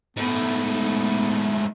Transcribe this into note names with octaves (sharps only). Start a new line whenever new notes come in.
G#2 A3 B3